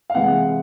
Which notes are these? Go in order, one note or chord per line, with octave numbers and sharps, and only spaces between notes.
F5
C3 E3 G#3 F#5